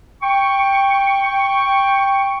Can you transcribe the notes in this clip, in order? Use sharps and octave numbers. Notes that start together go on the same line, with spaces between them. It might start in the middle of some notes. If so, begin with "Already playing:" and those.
G5 C#6